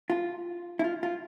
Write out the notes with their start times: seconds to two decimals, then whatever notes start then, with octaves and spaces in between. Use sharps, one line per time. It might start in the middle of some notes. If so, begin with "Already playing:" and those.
0.10 F4
0.79 E4
0.84 F4
1.03 F4